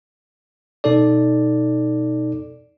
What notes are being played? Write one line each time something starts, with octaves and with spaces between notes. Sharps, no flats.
B2 D#4 A4 D5